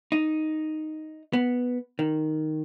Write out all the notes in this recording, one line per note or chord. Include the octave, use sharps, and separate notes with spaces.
D#4
B3
D#3